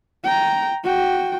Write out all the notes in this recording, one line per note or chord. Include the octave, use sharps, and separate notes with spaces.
G5 A#5
F#4 G5